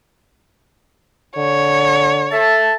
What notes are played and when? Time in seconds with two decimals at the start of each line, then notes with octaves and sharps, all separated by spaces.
1.37 D3 C#5
2.32 A4 E5 A5